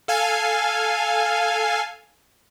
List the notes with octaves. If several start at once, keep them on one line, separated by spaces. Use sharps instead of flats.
A4 F5 G#5